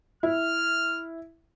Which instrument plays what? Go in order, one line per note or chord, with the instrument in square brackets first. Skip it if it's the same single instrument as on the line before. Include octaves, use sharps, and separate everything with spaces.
[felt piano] E4 [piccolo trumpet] F6